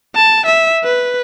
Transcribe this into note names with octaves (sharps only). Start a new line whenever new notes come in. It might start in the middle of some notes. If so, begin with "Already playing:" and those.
A5
E5
B4